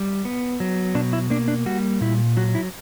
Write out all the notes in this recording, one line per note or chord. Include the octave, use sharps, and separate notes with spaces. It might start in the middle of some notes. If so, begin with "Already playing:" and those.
Already playing: G3
B3
F#3
B2 D4
E4
A#3 D4
D4
G3 F#4
A#2 E4
F#3 F#4
E4